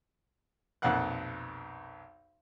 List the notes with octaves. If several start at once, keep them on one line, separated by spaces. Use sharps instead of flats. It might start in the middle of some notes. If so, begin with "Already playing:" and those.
B1 F2 A#2 F5 F#5 F#6